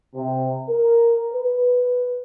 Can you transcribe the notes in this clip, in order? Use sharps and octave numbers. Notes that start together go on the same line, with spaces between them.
C3
A#4
B4